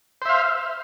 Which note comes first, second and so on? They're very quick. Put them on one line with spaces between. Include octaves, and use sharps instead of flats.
C5 E5 F5